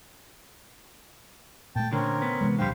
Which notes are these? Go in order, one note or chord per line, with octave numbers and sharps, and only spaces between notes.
A#2 A3 G5 A5
D3 C4 C#4 A#4
B3
C3 E3 G#3
D1 A#1 D3 G3 C5 F5 G5